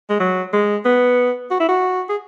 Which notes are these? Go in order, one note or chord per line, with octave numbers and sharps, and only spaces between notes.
G#3
F#3
G#3
B3
F#4
E4
F#4
G#4